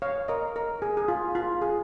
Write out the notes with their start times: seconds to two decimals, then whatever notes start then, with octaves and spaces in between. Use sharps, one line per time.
0.02 C#5 F5
0.28 A#4 D#5
0.56 A#4
0.82 G#4
0.97 G#4
1.08 F4
1.35 F4
1.62 G#4